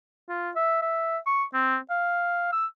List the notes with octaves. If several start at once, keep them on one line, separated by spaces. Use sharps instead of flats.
F4
E5
E5
C#6
C4
F5
E6